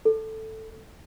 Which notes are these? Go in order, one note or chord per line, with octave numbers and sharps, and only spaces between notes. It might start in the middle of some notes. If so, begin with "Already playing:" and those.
A4